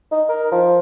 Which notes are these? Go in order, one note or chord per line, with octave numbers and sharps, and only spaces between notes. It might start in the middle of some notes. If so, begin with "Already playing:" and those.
D#4
A#4
F3